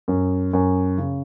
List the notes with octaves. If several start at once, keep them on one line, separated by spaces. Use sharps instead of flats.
F#2
F#2
C#3